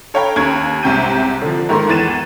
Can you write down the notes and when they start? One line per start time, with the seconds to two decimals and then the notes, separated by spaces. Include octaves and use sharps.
0.14 A4 C#5 F5 G5 A#5 B5
0.36 D#2 C#4 G#6
0.83 C2 G#2 C3 G5 G6 D#7
1.42 D3 F3
1.69 G#2 D#3 A3 A#3 C6
1.88 E2 E3 A6 D#7 E7